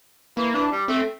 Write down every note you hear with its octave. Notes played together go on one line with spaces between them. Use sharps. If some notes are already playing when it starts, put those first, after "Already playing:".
E3 A#3
E3 D4
G3
A3 C4